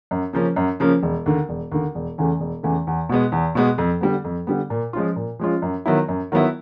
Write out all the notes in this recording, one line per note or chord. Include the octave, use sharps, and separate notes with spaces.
F#2
C#3 F3 A#3 C#4
F#2
C#3 F3 A#3 C#4
E1
D#2 D3
E1
D#2 D3
E1
E2 C#3 E3 A3
E1
E2 C#3 E3 A3
E2
B2 G#3 B3
E2
B2 G#3 B3
F2
D3 G3 B3
F2
D3 G3 B3
A#2
F3 G#3 C#4 F4
A#2
F3 G#3 C#4 F4
F#2
D#3 F#3 B3 E4
F#2
D#3 F#3 B3 E4